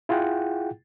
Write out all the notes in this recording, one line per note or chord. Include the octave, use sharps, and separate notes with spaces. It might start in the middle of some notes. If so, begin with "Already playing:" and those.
E4 F4 G#4 F#5 G5